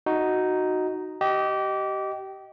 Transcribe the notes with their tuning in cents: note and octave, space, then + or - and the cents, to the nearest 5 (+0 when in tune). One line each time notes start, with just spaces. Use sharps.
D#4 +0 F#4 +0
G4 -25 D#5 +0